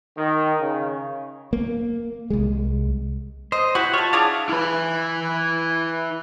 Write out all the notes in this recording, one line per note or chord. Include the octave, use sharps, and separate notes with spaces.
D#3
C#3
A#3
C2 G#3
C5 D#5
E4 F#4 G4 B4
F4 A4 C#5
D4 E4 G#4 F5
E4 B4